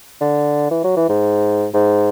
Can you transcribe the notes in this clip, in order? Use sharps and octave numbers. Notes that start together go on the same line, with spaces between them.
D3
E3
F#3
E3
G#2
G#2